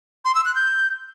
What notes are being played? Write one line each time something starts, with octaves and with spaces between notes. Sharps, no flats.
C6
E6
F#6
G6